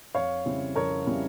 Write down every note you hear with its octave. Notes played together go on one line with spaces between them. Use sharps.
F2 C#5 F5
C#3 G3 C4 E4
F2 A#4 C#5
C#3 G3 C4 E4